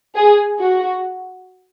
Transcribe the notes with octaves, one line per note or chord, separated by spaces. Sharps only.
G#4
F#4